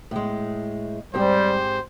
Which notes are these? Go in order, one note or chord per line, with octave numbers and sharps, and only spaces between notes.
A2 G#3
G#2 G3 C4 G4 C5